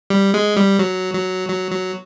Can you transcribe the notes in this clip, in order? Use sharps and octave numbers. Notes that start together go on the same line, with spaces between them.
G3
G#3
G3
F#3
F#3
F#3
F#3